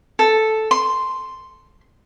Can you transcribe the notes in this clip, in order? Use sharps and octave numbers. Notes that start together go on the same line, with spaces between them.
A4
C6